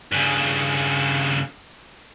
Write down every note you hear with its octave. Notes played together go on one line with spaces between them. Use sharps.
G2 C#3